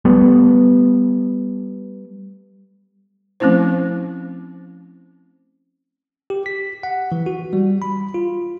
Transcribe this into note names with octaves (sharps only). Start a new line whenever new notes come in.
G3 A3 B3
F3 A3 C4 C#4 E4 C5
G4
B6
F#5
E3
F#4
G3
B5
F4